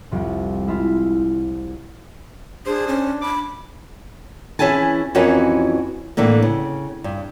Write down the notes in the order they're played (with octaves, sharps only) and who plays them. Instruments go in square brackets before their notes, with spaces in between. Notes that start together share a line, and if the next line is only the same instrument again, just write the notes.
[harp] C2 F2 C3
G#3 E4 F4
[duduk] D4 [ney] G#4 [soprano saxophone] C5
[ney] C#4
[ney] B5 [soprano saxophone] D6
[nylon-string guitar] E3 C#4 E4 G#4 G#5 A5
F2 E3 C#4 F#4 A#4 B4
A2 D3 E3 A#3
C#3
G2